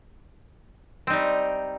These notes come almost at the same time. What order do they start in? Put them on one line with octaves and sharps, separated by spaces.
C4 D#4 G3